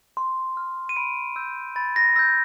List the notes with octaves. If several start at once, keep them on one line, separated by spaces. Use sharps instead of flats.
C6
F6
D#7
B5 D7
E6 G6
B5 A6
A#6
E6 G6 A#6